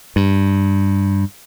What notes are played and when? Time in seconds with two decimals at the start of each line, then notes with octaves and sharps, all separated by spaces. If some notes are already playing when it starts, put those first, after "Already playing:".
0.16 G2